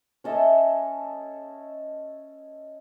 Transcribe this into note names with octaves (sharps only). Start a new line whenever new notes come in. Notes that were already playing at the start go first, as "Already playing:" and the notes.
C#4 A4 D#5 E5